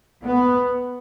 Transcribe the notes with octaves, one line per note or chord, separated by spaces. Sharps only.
B3